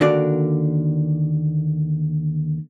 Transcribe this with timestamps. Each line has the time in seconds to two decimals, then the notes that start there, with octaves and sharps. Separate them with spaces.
0.01 D#2 D3 F#4 A#4 D5